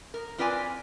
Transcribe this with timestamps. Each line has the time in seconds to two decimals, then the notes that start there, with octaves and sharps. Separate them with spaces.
0.14 A#4
0.38 C4 F4 B4 D5 E5 G#5